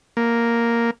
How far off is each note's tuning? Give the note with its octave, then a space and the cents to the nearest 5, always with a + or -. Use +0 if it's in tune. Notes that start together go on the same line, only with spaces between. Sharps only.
A#3 +0